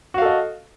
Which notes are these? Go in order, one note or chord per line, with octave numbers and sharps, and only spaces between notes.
F#4 A4 D#5 F5